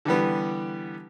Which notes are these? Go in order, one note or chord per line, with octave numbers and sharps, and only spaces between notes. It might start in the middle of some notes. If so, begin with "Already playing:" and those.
D3 E3 G3 B3